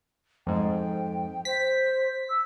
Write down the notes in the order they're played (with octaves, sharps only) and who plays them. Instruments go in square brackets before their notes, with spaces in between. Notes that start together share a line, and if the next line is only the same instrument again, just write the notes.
[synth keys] F2 G#2 [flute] G5
[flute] C5 [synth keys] B6
[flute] E6